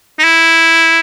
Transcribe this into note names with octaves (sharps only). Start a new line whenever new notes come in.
D#4
E4